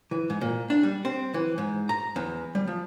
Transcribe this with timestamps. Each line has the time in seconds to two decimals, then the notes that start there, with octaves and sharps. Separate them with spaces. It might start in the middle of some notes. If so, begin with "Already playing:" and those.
0.11 E3
0.30 G#2
0.41 A#2
0.70 D4
0.83 G3
1.05 C4
1.34 E3
1.58 G#2
1.89 A#5
2.16 E2
2.55 G3
2.67 F3